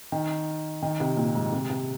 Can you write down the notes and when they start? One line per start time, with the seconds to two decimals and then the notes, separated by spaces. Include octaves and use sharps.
0.12 D#3
0.82 D#3
1.00 C3
1.17 A#2
1.35 G#2
1.52 C3
1.70 C3